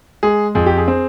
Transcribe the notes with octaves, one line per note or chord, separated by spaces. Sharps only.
G#3 G#4
F2 G#4
G4
G#4
C4